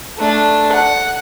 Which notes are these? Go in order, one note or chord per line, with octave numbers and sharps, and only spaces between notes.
A3 D4
F#5